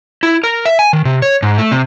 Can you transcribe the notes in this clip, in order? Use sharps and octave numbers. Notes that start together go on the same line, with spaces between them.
E4
A#4
E5
G#5
D#3
C3
C#5
G#2
A3
C3